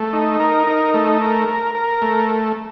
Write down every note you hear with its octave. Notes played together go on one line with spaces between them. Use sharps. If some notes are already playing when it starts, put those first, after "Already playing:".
Already playing: A3
D#4
A#4
D#4
A3
A#4
A#4
A#4
A3